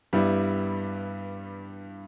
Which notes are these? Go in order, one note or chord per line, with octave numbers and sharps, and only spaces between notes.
G2 G3 B3 E4